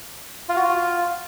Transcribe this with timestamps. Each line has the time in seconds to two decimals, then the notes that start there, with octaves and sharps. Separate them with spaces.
0.49 F4
0.56 F#4
0.64 F4